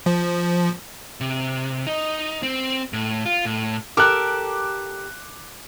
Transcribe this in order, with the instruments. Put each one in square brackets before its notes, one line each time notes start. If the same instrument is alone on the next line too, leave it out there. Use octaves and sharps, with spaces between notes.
[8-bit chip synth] F3
[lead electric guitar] C3
D#4
C4
A2
F4
A2
[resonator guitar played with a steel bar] G4 A4 A#4 [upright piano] D6 F#6